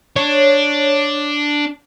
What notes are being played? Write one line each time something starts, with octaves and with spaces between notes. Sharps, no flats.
D4 C#5